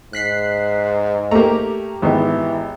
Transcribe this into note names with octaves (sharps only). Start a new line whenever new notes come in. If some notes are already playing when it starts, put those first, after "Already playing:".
G#2 F#6 B6 C7
A3 A#3 G4 A#5
G#1 E3 B3